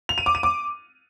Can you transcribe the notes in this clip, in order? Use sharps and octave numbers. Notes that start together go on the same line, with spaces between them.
F7
D#7
D6
D#7
D6